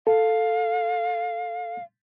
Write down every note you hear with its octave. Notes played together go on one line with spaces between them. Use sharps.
A4 F5